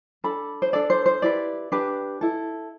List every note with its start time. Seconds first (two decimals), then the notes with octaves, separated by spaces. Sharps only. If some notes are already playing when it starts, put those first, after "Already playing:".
0.24 D4 A4 B5
0.62 C5
0.73 D4 A4 D5
0.90 C5
1.06 C5
1.22 E4 G4 B4 D5
1.72 D4 G4 B4
2.21 E4 A4